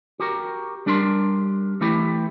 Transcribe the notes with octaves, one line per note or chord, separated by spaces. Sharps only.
F#4 G4 A#4
G3 D4 G4 A#4 C6
E3 A3 E4 G4